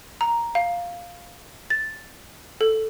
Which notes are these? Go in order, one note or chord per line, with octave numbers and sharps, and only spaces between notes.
A#5
F5
A6
A4